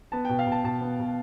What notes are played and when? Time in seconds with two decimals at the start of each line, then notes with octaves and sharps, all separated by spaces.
0.12 B3 A5
0.25 B2 G5
0.39 F5
0.47 B2
0.52 A5
0.64 B2 A5
0.81 B3
0.99 B2